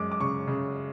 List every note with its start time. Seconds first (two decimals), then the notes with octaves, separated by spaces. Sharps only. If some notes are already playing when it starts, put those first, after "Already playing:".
Already playing: F#2 G#3 D6
0.12 D6
0.20 C#3 C#6
0.48 C#3